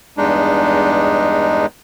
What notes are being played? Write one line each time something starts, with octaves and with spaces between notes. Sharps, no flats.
E2 G2 G#3 D4 D#4